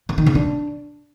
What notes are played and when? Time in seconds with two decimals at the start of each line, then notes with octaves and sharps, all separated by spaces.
0.09 D3
0.18 D#3
0.26 C#3
0.35 D4